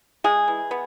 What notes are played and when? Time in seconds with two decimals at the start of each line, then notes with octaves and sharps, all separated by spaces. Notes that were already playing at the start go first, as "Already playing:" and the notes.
0.24 G#3 G#4
0.48 E3
0.71 B3